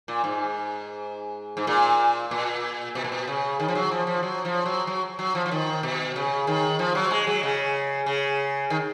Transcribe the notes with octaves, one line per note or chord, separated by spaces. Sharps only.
A#2
G#2
G#2
A#2
A#2
B2
A#2
B2
C#3
D#3
F3
F#3
F3
F3
F#3
F3
F#3
F#3
F#3
F3
F3
D#3
B2
C#3
D#3
F3
F#3
G#3
F#3
C#3
C#3
D#3